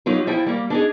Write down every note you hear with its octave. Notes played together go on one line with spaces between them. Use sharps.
F#3 D#4 F4 G4
F3 E4 G5
G3 A#3
D4 D#4 G#4